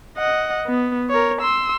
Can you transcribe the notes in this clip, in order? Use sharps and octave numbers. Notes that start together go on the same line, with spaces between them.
D#5 F#5
B3
A#4 C#5
C6 E6